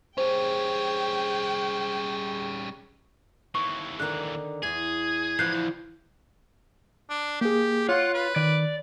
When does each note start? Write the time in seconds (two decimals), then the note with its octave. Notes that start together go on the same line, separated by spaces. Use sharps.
0.18 G3 C#4 G#4 C5 G5
3.55 D#2 E3 C#6
4.00 D3 D#3 F#6
4.63 E2 G#4 G#6
5.39 F2 D3 E3 F3 F#6 G6 C7
7.10 D4
7.41 A#3 G4 G#4
7.89 F4 C#5 F#5
8.14 B4
8.36 D#3 D5